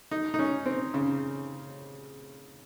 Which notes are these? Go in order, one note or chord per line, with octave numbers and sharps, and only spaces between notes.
D#4
D#4
C#4
C4
C#3